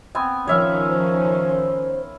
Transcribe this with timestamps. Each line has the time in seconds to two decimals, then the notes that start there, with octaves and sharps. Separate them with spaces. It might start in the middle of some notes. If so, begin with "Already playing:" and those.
0.15 B3 C4 G#5
0.47 D#3 F3 C#4 C#5 E5 F5
0.89 C5